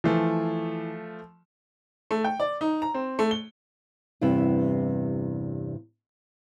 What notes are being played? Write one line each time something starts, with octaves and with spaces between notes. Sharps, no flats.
E3 F3 A3
A3
G5
D5
D#4
A#5
C4
A3
G7
E2 G2 C3 B3 E4